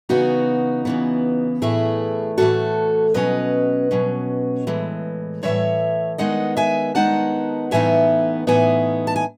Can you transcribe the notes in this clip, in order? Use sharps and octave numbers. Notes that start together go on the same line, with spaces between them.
C#3 E3 B3 D#4 F#4
C#3 E3 B3
A2 E3 A3 E4 G#4
A2 E3 A3 F#4 A4
B2 F#3 C#4 B4 D#5
B2 F#3 C#4
A2 E3 G#3
A2 E3 G#3 C#5 E5
D#3 G#3 B3 D#4 D#5 F#5
E5 G#5
D#3 G#3 B3 D#4 F#5 A5
A2 E3 B3 D#4 E5 G#5
A2 E3 B3 D#4 E5 G#5
A5
G#5